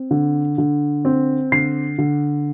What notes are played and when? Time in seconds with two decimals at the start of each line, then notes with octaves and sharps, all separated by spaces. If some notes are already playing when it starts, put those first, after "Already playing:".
Already playing: C4
0.11 D3
0.58 D3
1.05 C4
1.52 D3 C7
1.98 D3